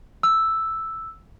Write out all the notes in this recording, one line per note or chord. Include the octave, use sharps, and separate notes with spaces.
E6